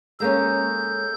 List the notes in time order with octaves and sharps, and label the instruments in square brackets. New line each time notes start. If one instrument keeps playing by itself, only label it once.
[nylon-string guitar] G#3 A#3 C#4 [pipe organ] A4 G6